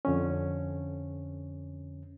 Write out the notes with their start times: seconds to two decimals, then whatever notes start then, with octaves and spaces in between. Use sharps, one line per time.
0.05 F2 D3 C#4